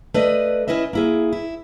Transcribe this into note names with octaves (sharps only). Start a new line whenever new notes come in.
A3 B4 D5 D#5
C#4 E4 B4 D#5 E5
A#3 E4 G#4
E4